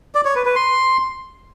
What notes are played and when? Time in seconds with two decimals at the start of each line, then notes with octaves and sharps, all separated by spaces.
0.15 D5
0.25 C#5
0.35 B4
0.45 B4
0.56 C6